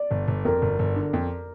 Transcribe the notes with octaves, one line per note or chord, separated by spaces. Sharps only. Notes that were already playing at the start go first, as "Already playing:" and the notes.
Already playing: D5
G1
G1
F2 A#4
G1
G1
D3
F2